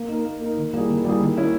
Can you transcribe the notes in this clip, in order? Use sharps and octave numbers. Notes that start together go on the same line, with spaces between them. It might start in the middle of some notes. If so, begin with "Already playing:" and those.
Already playing: A#3
D#4 A#4
A#3
D#4 A#4
D#3
G3 A#3 E4 G#4
D#3
G3 A#3 E4 G#4
D#3
A#3 C#4 E4